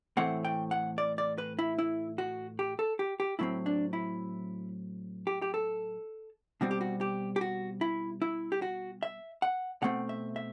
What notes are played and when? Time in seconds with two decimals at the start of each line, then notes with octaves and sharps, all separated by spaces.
0.17 A2 E3 A3 C4 F#5
0.45 G5
0.71 F#5
0.98 D5
1.18 D5
1.38 B4
1.59 E4
1.79 E4
2.18 F#4
2.59 G4
2.79 A4
2.99 G4
3.20 G4
3.39 A2 F#3 C4 E4
3.66 D4
3.93 E4
5.27 G4
5.42 G4
5.54 A4
6.61 B2 G3 C4 F#4
6.71 G4
6.81 F#4
7.01 G4
7.36 G4
7.41 F#4
7.81 E4
8.22 E4
8.52 G4
8.62 F#4
9.03 E5
9.42 F#5
9.82 B2 A3 C4 F#5
10.09 E5
10.36 E5